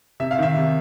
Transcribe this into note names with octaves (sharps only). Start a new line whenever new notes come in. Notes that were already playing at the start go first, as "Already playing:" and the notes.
C3 E5
F5
D#3 E5
C3